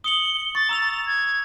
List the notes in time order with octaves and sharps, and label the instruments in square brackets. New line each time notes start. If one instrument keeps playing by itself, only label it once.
[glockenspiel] D#6 C#7 F#7 [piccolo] G7
[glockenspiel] C#6 [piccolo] A6
[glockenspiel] A#5 E6 F7
[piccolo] G#6